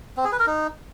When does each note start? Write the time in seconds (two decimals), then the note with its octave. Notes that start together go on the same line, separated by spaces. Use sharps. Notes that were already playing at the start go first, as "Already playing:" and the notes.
0.17 C4
0.25 G#4
0.32 B4
0.39 A#4
0.47 D#4